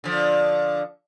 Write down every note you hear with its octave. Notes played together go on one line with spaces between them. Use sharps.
D3 F3